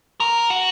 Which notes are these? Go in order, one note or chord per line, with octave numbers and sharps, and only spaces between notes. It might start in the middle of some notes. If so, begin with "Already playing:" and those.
A#4
F#4